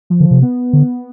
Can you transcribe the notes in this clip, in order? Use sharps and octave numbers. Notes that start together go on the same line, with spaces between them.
F3
D3
C3
B3
D3